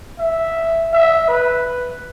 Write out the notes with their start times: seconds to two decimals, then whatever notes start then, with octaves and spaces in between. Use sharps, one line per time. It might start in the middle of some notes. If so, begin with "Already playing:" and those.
0.19 E5
0.93 E5
1.29 B4